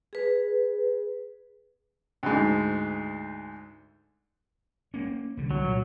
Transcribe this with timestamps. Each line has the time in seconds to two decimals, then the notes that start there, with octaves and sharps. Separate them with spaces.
0.13 G#4 B4
2.23 D2 G#2
4.94 A#3 C#4
5.37 C2 D3
5.51 F#3
5.64 A#2